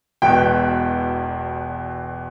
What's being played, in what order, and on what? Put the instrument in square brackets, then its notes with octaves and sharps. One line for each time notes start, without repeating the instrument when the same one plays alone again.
[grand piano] E1 E2 B2 G5